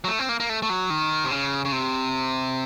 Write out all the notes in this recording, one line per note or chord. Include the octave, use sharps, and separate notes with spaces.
F#3
A3
C4
A#3
A#3
A3
A3
F#3
D#3
C3
C#3
C#3
C3